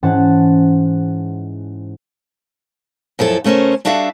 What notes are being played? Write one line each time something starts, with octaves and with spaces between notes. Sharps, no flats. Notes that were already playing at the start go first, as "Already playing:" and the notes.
G#2 E3 C#4 C5 F#5 A5
F#2 F3 E4 A4
C#3 A3 C#4 A#4 C5
G3 D4 F#4 A4 E5 F5